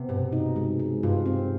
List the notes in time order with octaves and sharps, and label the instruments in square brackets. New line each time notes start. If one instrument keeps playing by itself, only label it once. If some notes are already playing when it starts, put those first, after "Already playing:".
Already playing: [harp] C3 [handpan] B3
[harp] G2 [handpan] B2
[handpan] D#4
G#3
G#3
[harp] G2 [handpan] F4
[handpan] C4